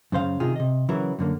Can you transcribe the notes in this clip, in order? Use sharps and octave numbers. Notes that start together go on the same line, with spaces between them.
F#2 C#3 C5 F5
C3 D#3 F4 G#4
C3 D#5
C#3 E3 F#3 E4 A#4
F#2 D3 A#3